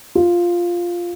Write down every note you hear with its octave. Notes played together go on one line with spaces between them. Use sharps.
F4